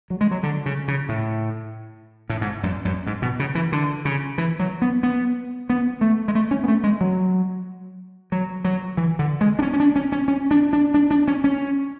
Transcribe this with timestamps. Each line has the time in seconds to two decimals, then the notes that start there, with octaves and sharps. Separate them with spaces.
0.10 F#3
0.21 G#3
0.31 F#3
0.43 D3
0.66 C#3
0.88 C#3
1.09 A2
2.30 A2
2.41 G#2
2.63 F#2
2.85 F#2
3.07 G#2
3.22 B2
3.40 C#3
3.55 E3
3.72 D3
4.05 C#3
4.38 E3
4.59 F#3
4.82 B3
5.03 B3
5.70 B3
6.01 A3
6.28 G#3
6.35 A3
6.51 C#4
6.64 B3
6.68 A3
6.84 G#3
7.01 F#3
8.32 F#3
8.65 F#3
8.97 E3
9.19 D3
9.41 G#3
9.59 D4
9.62 C#4
9.73 C#4
9.80 D4
9.96 C#4
10.12 C#4
10.28 C#4
10.51 D4
10.73 D4
10.94 D4
11.11 D4
11.28 C#4
11.44 C#4